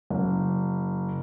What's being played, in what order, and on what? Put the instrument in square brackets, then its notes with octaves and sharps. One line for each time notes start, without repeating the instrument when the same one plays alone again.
[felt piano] F#1